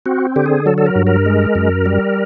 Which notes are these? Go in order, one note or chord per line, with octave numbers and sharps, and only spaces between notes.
C4 F#4
D3 G4
G#4
F#3 A4
A4
A#4
G2
A#4
G#3
F#2
G3